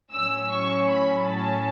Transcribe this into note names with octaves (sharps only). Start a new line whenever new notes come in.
A2 F#3 C#4 E6
C#6
B5
A5